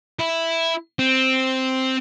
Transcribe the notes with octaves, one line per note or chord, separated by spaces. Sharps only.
E4
C4